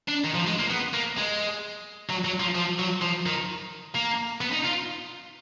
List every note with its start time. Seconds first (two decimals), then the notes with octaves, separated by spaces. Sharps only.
0.08 D4
0.25 D#3
0.35 F3
0.47 G#3
0.59 A#3
0.70 B3
0.94 A#3
1.17 G#3
2.10 F#3
2.25 F#3
2.40 F3
2.55 F3
2.79 F#3
3.02 F3
3.26 D#3
3.95 A#3
4.41 B3
4.53 D#4
4.65 F4